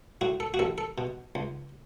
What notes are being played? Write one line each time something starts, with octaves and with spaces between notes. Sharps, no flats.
A2 F#4
A4
F#4
A1 A4
A4
B2
C#2